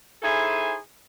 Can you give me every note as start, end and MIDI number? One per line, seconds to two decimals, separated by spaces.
0.23 0.74 63
0.23 0.74 64
0.23 0.74 68
0.23 0.74 69
0.23 0.74 72
0.23 0.74 80